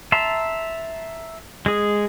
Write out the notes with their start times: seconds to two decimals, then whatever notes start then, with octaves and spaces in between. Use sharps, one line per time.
0.12 E5 A5 A#5 C6
1.66 G#3 G#4